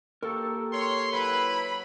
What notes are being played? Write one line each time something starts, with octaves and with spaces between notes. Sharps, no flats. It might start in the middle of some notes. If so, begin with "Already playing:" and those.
A#3 G4 A4 A#4 C#6
C#5 C6
F#3 E4 B4 B5